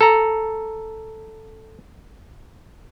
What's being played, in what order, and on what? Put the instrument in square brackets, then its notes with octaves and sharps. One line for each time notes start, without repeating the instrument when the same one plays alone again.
[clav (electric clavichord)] A4 A#5